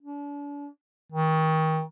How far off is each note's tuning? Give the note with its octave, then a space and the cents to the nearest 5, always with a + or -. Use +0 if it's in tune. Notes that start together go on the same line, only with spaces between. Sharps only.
D4 -35
D#3 +30